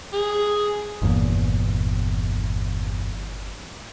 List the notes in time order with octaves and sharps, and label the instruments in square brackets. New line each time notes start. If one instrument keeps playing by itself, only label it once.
[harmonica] G#4
[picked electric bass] G1 E2 A#2